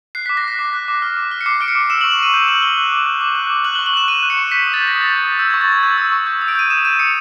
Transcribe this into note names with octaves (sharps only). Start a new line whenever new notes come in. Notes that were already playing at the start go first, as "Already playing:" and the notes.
F#6 C7
D6 B6
A#6
F#6 B6
D6
F#6
D6
F6
D6
F6
C#7
D6 C7
F6 D7
C#7
D6
E6 E7
C#6 F#7
E7
C#6 D#7
G6 E7
E6 F#7
C#6 G7
F#6
D6
F#6
D6
F#6
D6
F#6 F#7
C#6 G7
F#7
F#6 E7
C#6 D#7
F#6
C#7
C#6
G6 B6
D#6
A6
G6
A#6
D#6
A6
G6
D#6
E6 G6
C#6 G#6
A6
C#6 G#6
G6
E6
C#6
G6
D#6
D7
G6 D#7
D#6 E7
G6 D#7
D#6 C#7